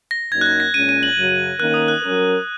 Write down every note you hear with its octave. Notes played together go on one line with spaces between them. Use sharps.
A#6
F#2 F#3 A#3 D#4 F#4 G#6
F#6
G#6
A#6
A#2 G#3 C#4 D#7
D#7
F#7
F#2 C#3 F#3
D#3 A#3 C#4 A#4 F#6
D#6
F#6
F#3 C#4 A#4